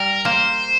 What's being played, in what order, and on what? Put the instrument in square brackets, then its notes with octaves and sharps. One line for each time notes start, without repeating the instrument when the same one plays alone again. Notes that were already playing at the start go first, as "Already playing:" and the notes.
Already playing: [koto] G3 [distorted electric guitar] A#4
[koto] A#3 [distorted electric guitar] C5